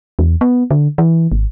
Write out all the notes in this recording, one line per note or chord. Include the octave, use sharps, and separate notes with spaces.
E2
B3
D3
E3
G#1